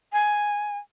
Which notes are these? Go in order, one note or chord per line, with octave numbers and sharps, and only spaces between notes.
G#5